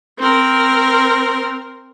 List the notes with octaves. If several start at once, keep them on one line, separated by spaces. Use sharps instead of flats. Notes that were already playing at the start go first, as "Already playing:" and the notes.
C4 A#4